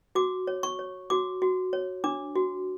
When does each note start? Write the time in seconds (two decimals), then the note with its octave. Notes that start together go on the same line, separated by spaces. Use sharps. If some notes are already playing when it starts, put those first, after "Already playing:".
0.15 F#4 D6
0.47 C#5
0.63 C#6
0.79 C#5
1.10 F#4 D6
1.42 F#4
1.73 C#5
2.04 D4 D6
2.36 F#4